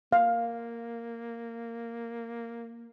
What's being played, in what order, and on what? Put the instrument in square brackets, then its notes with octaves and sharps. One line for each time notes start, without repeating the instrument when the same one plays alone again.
[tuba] A#3 [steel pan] F5